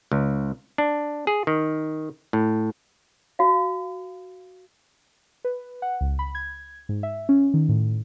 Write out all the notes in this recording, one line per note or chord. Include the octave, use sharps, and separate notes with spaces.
C#2
D4
G#4
D#3
A2
F#4 F5
B4
F#5
C#2
B5
G#6
G#2
E5
C#4
D#3
A2